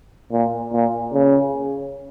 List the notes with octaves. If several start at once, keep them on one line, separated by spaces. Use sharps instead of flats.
A#2
A#2
C#3